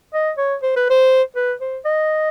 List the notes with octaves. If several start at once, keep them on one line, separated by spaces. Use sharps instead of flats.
D#5
C#5
C5
B4
C5
B4
C5
D#5